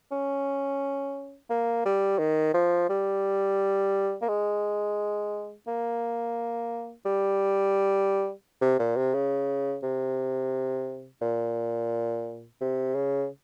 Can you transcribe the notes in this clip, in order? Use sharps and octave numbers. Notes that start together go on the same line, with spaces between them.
C#4
A#3
G3
D#3
F3
G3
A#3
G#3
A#3
G3
C3
A#2
C3
C#3
C3
A#2
C3
C#3